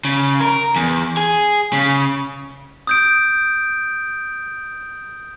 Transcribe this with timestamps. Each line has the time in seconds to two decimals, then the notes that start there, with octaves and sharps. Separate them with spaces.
0.05 C#3
0.40 A#4
0.76 E2
1.17 G#4
1.73 C#3
2.87 D#6 G6 D7